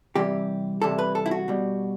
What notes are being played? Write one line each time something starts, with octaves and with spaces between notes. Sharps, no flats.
C3 E3 G3 G4
C3 E3 G3 A4
B4
A4
E4
F#4
B2 G3